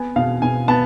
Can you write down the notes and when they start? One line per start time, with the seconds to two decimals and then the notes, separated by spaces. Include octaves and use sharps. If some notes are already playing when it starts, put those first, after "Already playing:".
Already playing: B3 G#5
0.16 B2 F5
0.42 B2 G#5
0.68 B3 A5